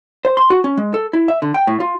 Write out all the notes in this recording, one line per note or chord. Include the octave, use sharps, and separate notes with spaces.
C5
C6
F#4
C#4
G#3
A4
E4
E5
D3
G5
A2
F4